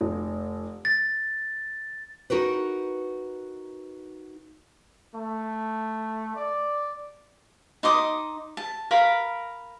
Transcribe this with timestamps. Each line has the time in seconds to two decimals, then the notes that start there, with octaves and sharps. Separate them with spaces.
0.01 F1
0.85 A6
2.30 D#4 F#4 A#4 B4
5.15 A3
6.36 D5
7.83 D#4 C6 D6 D#6
8.57 A5
8.91 A#4 F5 B5